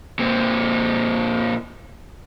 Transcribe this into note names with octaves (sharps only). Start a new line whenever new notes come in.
A#2 C4